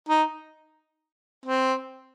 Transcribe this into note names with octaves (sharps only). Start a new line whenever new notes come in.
D#4
C4